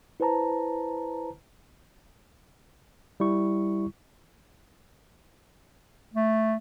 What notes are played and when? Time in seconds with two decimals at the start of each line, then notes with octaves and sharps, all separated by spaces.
0.20 E4 B4 C5 A5 A#5
3.20 G3 E4 C#6
6.14 A3